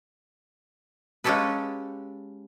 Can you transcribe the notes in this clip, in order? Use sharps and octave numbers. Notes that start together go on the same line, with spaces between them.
G#3 A#3 C#4 G4 A4 B4